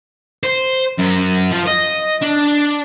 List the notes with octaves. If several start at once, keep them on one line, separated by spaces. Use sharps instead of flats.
C5
F#2
F3
D#5
D4